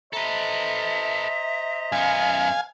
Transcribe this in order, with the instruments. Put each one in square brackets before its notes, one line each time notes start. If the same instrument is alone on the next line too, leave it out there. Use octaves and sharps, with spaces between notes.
[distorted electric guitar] A4 B4 [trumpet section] C5 D#5 A#5 [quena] E5
[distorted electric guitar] F#2 B3 [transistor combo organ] F5 G#5